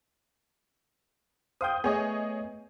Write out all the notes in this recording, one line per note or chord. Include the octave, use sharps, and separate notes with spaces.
C5 F5 G5 D#6 G6
A3 B3 G#4 C#5 D#5